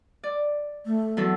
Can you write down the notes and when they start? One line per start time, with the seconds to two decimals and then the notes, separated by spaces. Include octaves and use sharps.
0.23 D5
0.86 A3
1.17 E2 F#3 A4